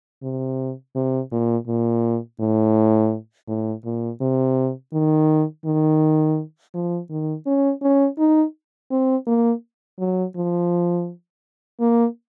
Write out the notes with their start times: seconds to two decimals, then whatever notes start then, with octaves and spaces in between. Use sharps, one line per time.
0.23 C3
0.95 C3
1.31 A#2
1.67 A#2
2.40 A2
3.48 A2
3.85 A#2
4.21 C3
4.93 D#3
5.65 D#3
6.74 F3
7.10 D#3
7.46 C#4
7.82 C#4
8.18 D#4
8.91 C4
9.27 A#3
9.99 F#3
10.35 F3
11.80 A#3